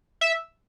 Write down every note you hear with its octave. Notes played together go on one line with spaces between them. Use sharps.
E5